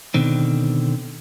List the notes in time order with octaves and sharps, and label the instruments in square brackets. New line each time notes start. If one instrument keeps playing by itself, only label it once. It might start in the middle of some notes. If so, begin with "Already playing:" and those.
[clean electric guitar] B2 D3 D#3 C4